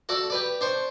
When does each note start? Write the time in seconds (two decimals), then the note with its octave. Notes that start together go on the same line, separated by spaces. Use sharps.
0.09 F#4 A4 D5 F#5
0.30 G4 B4 D5
0.61 D4 C5 C#6